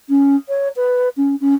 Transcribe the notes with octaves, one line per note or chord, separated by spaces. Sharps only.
C#4
C#5
B4
C#4
C#4